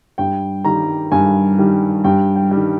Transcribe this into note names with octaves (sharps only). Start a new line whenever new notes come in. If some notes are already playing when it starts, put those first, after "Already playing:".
G2 G5
D#3 G3 A#5
G2 G#5
D#3 G3
G2 G5
G5
D#3 G3